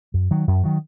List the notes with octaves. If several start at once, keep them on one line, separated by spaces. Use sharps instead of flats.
F#2
D#3 F#3
F#2
D#3 F#3